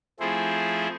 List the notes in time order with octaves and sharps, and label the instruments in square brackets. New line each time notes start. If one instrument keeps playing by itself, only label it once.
[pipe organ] F3 A3 C4 E4 G#4 C5